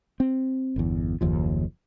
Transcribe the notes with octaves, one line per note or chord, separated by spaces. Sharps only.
C4
G1 E2
F#1 D#2 F3